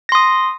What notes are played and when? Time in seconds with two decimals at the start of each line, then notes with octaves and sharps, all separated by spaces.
0.09 A#6
0.12 C6
0.15 D#6